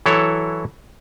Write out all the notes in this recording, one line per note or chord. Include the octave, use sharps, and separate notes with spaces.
E3 F#3 E4 A4 C#5